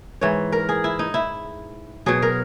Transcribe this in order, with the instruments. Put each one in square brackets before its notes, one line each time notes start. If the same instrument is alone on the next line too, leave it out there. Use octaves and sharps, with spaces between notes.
[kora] G#2 E3 C#5
A#4
G#4
E4
D#4
E4
B2 F#3 G#4
A#4